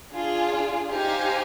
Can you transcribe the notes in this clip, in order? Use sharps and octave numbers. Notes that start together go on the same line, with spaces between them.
D4 F4 G#4
D#4 G4 C5 F5 G#5